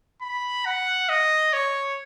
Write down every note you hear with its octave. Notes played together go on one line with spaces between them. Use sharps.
B5
F#5
D#5
C#5